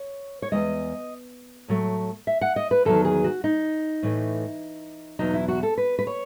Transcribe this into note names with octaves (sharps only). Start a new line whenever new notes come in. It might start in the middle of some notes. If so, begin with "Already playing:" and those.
Already playing: C#5
C#5
E2 C#3 G#3 D#5
A2 F#3 A3
E5
F#5
D#5
B4
E2 D#3 F#3 A4
G#4
F#4
D#4
A2 E3 A3
E2 B2 F#3 D#4
E4
F#4
A4
B4
B4
C#5